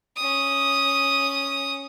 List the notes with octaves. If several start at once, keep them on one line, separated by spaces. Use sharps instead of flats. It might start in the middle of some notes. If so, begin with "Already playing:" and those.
C#4 D#6